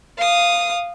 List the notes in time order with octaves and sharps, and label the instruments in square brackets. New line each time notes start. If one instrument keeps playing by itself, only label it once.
[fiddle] F5 D#6